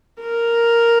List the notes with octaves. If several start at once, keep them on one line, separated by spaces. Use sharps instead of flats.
A#4